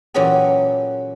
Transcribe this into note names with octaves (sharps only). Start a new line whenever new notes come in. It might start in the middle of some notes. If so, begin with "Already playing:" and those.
A#2 E3 F#3 C#4 G4 G#4